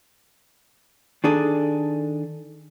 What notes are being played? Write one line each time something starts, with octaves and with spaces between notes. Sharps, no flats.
D#3 D4 G#4 A4